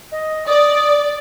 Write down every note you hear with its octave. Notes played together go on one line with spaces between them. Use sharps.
D#5
D5 D#6